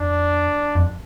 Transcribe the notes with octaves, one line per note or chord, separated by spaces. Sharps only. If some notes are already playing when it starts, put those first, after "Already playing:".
Already playing: F2 D4
F2